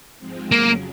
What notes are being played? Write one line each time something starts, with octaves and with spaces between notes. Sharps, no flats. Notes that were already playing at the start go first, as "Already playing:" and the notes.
G#2 F3 G#3 C4
F2 C#3 F#3 A#3